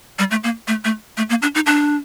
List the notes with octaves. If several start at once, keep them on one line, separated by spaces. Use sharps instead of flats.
G3
A3
A#3
A3
A3
A3
A#3
D4
D#4
D4